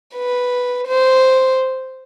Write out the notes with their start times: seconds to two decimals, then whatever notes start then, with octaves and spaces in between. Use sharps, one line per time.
0.16 B4
0.88 C5